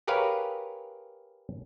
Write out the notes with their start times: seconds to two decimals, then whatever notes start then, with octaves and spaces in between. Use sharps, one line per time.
0.08 G4 G#4 A#4 B4 C#5 F5